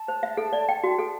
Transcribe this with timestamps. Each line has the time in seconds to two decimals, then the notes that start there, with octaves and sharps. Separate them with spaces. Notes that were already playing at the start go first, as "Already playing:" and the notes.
Already playing: A5
0.08 C5
0.23 E5
0.37 A4
0.53 D5
0.69 G5
0.84 F#4
0.98 A4